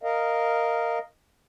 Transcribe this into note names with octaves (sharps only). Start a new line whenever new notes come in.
A#4 D#5 F5